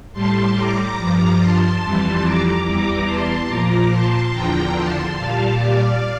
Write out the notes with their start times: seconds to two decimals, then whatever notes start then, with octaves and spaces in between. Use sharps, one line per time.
0.13 A2 G3 A5 C6
0.54 A#5 D6
0.96 G2 F3
1.38 A5 C6
1.81 F2 E3 G3
2.22 A#5 D6
2.64 E2 E3 G3 A#5 D6
3.06 A5 C6
3.48 A#2 F3 A#5 D6
3.90 A5 C6
4.31 E2 D3 F3 G5 A#5
4.74 A5 C6
5.15 A#2 G3 F5 A5
5.57 D5 F5